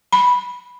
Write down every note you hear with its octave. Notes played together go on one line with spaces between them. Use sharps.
B5